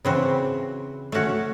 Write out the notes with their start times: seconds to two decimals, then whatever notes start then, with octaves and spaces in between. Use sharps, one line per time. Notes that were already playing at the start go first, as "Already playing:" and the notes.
0.05 C#3 E3 C4 F#4
1.12 A3 C#4 F#4 C#5